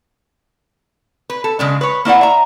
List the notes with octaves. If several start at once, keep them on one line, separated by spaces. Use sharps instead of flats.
B4
A4
C#3 G#3 D4
B4 C#5
A#3 E4 D5 F#5
E5 A#5